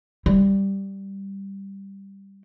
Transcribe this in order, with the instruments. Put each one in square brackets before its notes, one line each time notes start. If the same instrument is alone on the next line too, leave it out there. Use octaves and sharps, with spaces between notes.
[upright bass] G3